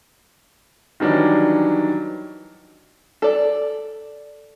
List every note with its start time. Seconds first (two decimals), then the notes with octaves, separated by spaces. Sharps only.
1.00 D#3 E3 F#3 G3 D4
3.22 A4 D5